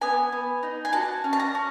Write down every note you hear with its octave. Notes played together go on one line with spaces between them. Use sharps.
B3 G#5
B3
D#4
G#5
F#4 A5
C#4
A5
A#5
C#4